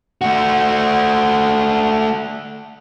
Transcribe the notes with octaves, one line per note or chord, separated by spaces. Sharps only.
A3 F#4